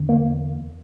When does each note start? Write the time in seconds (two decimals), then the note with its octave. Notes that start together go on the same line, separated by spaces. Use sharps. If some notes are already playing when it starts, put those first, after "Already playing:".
Already playing: E2 D3
0.09 A#3